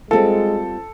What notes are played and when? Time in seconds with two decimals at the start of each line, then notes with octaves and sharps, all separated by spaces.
0.11 G3 G#3 C4 F4 A4